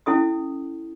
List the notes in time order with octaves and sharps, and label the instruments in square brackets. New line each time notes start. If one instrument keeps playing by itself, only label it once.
[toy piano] C#4 E4 A4 D#6